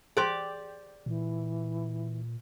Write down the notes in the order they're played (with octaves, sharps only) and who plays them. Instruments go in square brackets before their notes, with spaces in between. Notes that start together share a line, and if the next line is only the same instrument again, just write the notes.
[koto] G4 D5 [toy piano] G#4 C5 C6
[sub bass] A#2 [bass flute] E3